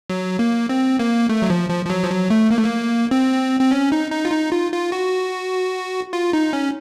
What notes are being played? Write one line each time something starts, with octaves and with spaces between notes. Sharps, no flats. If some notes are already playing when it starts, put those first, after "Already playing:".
F#3
A#3
C4
A#3
A3
F#3
F3
F3
F3
F#3
F3
F#3
A3
A#3
A3
A#3
C4
C4
C#4
D#4
D#4
F4
D#4
F4
F4
F#4
F4
D#4
C#4